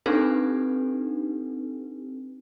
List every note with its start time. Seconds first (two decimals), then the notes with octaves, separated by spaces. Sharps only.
0.06 C4 D4 D#4 G4 A4 B4